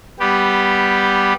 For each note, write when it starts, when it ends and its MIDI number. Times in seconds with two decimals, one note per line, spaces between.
0.20 1.33 55
0.20 1.33 59
0.20 1.33 67